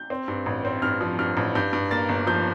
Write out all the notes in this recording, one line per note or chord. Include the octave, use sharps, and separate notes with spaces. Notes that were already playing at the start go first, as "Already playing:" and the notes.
Already playing: G6
C4
G2
A1
C4
G2 F6
F3
G2 F6
A1
G2 G6
G2
A#3 A6
G1
F3 G6